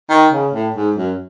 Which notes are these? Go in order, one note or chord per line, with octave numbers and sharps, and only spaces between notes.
D#3
C#3
A2
G#2
F#2